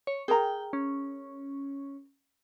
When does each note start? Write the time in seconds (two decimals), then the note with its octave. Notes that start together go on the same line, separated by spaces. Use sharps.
0.07 C#5
0.28 G#4 A#4 G5 A#5
0.73 C#4